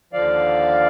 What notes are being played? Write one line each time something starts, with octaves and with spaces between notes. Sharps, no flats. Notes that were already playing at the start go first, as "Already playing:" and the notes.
D#2 D3 F3 D5 F5